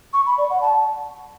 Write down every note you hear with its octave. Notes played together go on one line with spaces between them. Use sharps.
C#6
B5
D5
F#5
A5